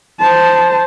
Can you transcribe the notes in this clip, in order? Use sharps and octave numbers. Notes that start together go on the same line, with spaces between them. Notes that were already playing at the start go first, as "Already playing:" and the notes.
C5 A5